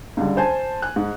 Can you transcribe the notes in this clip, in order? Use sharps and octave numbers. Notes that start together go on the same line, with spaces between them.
C#2 G2 D3
C5 G#5 A5
G#5 F#6
G#2